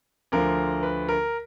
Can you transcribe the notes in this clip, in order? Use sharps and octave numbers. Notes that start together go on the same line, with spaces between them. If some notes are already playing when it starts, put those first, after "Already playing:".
D2 D3 F3 A#4
B4
A#4